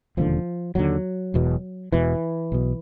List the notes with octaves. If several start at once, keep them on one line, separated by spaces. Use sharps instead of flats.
E1 D#2 D3 F3
E1 D#2 D3 F#3
E1 E2 B2
E1 E2 B2 E3
B1 B2